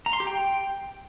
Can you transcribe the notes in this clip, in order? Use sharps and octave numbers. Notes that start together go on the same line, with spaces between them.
A#5
C6
G4
G5